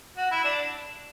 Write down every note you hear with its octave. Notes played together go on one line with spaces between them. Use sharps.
F#4
E4
D4